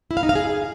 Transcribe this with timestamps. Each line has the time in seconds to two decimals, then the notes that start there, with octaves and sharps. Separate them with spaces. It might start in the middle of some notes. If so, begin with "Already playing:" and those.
0.11 E4
0.17 F5
0.23 D#4
0.29 F5
0.35 G#4